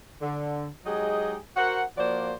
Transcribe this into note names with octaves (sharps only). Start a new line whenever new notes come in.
D3
F#3 G#3 D#4 G4 G#4 D#5
F#4 A#4 C5 F#5
F3 A#3 F#4 C5 D5